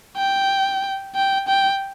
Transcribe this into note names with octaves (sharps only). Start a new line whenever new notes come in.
G5
G5
G5